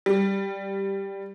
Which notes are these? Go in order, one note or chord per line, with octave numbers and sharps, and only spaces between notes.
G3